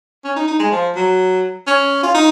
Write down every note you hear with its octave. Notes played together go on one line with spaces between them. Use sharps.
C#4
D#4
D#4
G#3
F3
F#3
C#4
F4
D#4